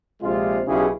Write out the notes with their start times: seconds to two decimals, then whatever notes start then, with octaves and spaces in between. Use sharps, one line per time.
0.22 A#1 C3 G#3 F4
0.66 B1 C#3 E4 G4 G#4